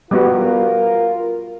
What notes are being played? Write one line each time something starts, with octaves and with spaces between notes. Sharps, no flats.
G3 B3 F4 F#4 A#4